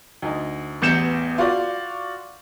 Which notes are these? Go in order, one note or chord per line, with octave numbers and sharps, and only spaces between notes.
D2 D#4
A1 E2 G6 C#7 E7
F4 F#4 D5